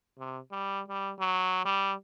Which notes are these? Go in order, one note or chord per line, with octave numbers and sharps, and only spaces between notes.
C3
G3
G3
F#3
G3